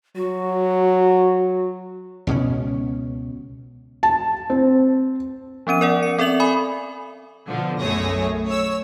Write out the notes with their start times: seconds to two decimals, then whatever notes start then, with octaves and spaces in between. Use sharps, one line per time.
0.16 F#3 F#4
2.27 C#2 B2 F#3 C#4
4.03 A5
4.50 C4
5.67 F3 B3 C#4 D#7
5.81 A#4 D5 F#5
6.03 C#7
6.18 C4 A4 D5 E5 F7 F#7
6.40 G#5 B5 D#6
7.47 B2 D3 F3
7.81 B1 F#2 A3 G#4 C#5 A#6
8.48 C#5 E6